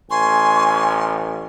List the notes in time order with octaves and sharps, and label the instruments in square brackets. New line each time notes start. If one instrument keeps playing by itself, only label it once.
[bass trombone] A1 [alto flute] G#5 [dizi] C6 [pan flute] C#6